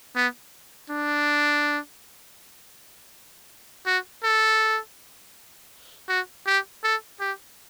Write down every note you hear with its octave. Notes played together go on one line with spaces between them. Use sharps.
B3
D4
F#4
A4
F#4
G4
A4
G4